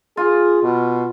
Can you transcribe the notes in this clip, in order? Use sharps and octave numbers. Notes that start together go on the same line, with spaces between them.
F4 G#4
B2